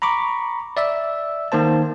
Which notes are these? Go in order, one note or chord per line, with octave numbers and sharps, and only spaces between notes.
A#5 B5 C#6 D6
D5 E5 E6
D#3 A#3 C5 A5